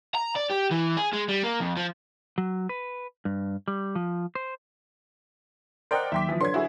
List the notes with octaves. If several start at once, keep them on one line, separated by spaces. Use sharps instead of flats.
A#5
D5
G4
E3
G#4
G#3
G3
A#3
F2
F3
F#3
B4
G2
G3
F3
C5
A#4 C5 D5 D#5 F#5 G5
D#2 F#3 E5 G5 C6 D6 B6
E3 F3
D3 B4 C#5 C6 G#6
E4 F#4 G#4